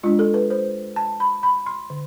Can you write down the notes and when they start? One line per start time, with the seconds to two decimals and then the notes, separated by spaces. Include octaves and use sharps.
0.03 G#3 D4 F4
0.19 A4
0.34 B4
0.50 C5
0.96 A5
1.20 B5
1.43 B5
1.66 C6
1.90 D3